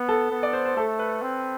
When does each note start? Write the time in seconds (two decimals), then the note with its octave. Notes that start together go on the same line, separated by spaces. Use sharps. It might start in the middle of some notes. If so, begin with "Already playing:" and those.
Already playing: B3
0.09 A4
0.31 B3
0.43 D5
0.53 C5
0.65 C5
0.77 A3 A4
0.99 B4
1.22 C4